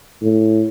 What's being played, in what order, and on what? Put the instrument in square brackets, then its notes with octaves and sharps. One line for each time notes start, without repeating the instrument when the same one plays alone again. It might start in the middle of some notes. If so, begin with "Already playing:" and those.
[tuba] A2